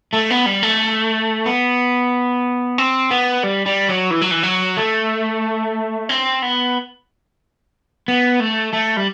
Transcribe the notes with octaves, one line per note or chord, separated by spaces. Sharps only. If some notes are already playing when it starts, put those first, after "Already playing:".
A3
B3
G3
A3
B3
C4
B3
G3
G3
F#3
E3
F#3
E3
F#3
A3
C4
B3
B3
A3
A3
G3